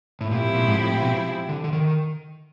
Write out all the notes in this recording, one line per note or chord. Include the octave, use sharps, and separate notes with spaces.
A2
A#2 F3 G#3 C4 E4 G4
A#2
G#2
A2
B2
D3
D3
D#3